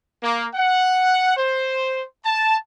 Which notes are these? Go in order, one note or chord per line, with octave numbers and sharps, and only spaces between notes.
A#3
F#5
C5
A5